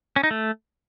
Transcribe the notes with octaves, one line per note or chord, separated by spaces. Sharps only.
C#4
D#4
A3